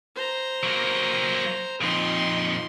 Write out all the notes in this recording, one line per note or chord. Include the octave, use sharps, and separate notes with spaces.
C5 A#5
F#3 A#3
F2 A#2 D#4 C6